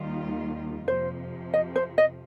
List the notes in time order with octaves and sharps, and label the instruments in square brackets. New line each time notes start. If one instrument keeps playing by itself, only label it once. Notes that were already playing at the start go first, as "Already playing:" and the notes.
Already playing: [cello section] D#2 D#3 G3 A#3 F4
[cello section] F2 C3 F3 [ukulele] C5
[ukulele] D#5
C5
D#5